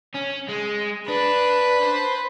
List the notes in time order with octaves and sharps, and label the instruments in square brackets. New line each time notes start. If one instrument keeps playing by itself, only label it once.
[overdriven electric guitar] C#4
G#3
[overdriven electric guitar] D4 [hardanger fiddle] B4
[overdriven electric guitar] C5